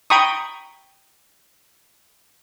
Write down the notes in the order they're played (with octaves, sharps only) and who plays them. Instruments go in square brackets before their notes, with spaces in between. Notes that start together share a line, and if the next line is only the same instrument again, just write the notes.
[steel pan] G5 A#5 B5 C#6 D#6